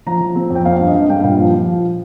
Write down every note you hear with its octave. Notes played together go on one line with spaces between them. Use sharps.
F3 A#5
F3
C4
F2
G5
C4 F5
G2
D#5
G2 F5
G2 G5
A#2 F5
F3
F3